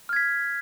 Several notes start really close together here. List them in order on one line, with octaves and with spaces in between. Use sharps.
F6 G#6 B6